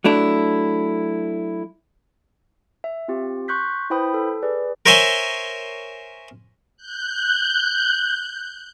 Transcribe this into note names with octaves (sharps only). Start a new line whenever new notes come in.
F#3 A3 D4 E4
E5
C4 F4 G4
C6 C#6 F#6 G6 B6
E4 B4 C5 G5 B5 D#6
A4
G#4 B4 D5
A#4 C5 C#5 E5 G#5 C6
F#6 G6